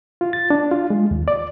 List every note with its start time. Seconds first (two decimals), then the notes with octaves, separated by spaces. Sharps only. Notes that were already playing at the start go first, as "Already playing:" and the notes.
0.21 F4
0.33 A6
0.50 D4
0.72 F4
0.90 G#3
1.11 D#2
1.28 D5